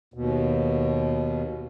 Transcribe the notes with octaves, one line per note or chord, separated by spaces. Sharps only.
D#2 B2